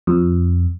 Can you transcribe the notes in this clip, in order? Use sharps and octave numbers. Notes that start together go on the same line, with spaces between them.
F2